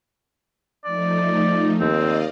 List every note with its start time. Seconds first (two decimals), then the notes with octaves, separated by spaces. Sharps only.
0.85 F3 A3 D#4 D5
1.80 D#2 C4 D5 D#5 F5